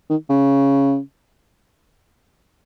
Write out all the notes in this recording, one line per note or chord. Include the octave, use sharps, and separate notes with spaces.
D#3
C#3